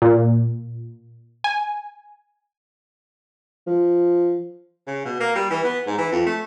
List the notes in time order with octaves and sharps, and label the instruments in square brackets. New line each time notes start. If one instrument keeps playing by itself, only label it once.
[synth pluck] A#2
G#5
[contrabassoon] F3
[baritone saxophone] C#3
B2
A#3
G3
E3
B3
G#2
E3
F2
A3